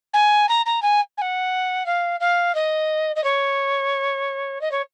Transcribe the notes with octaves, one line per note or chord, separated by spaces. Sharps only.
G#5
A#5
A#5
G#5
G#5
F#5
F5
F5
D#5
D#5
C#5
D#5
C#5